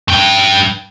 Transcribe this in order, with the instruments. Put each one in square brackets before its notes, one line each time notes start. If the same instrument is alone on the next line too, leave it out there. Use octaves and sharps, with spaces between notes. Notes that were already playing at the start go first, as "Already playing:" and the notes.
[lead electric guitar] G2 G5